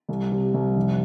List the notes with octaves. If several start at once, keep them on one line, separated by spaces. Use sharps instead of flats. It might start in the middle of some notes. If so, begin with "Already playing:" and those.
C2
C3
C2
F1